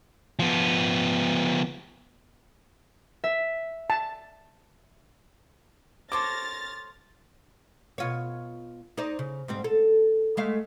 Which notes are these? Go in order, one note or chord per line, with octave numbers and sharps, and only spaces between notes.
F3 B3
E5
A5
A4 C5 C#5 D6 F6 A6 A#6
B2 F4 C#5
D#4 C5 D5
C#3
G#2 G3 C4
A4
G#3 A3 F5